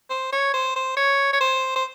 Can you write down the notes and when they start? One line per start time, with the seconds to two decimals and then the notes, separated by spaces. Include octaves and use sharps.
0.10 C5
0.32 C#5
0.54 C5
0.76 C5
0.97 C#5
1.33 C#5
1.41 C5
1.76 C5